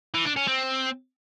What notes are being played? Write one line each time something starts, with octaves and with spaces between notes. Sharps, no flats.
E3
D4
C#4
C4